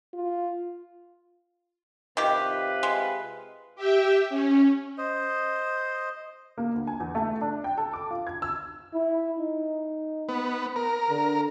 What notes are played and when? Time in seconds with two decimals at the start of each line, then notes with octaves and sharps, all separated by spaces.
0.13 F4
2.17 C3 D#3 F4 G4 B4
2.83 G#3
3.76 G4 E5 G5
4.29 C#4
4.98 C5 D#5
6.58 A#3
6.75 D2
6.87 G#5
7.00 E2
7.15 A3
7.41 D4
7.64 G5
7.78 A4
7.93 D6
8.11 F4
8.27 G#6
8.42 E6
8.94 E4
9.39 D#4
10.29 B3
10.76 A#4
11.10 D3